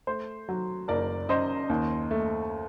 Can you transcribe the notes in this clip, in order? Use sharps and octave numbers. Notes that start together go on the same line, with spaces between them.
A3 C5
F#3
F#1 A#4 D5
F#2 C5 D#5
D#2
A3